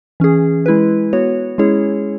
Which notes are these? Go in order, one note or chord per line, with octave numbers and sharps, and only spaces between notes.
E3 C#4 G#4
G#3 E4 B4
B3 F#4 C#5
G#3 C#4 E4 G#4 C#5